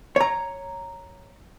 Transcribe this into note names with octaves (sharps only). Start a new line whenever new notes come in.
C#5 A#5